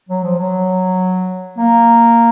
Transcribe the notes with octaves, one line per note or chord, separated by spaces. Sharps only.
F#3
F3
F#3
A#3